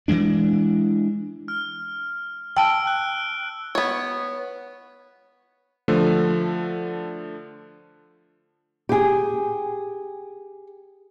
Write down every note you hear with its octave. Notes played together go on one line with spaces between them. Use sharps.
E3 F#3 G#3 D4
F6
G5 A5 E6 D7 G7
F#6
B3 C#5
D3 F3 A3
G4 G#4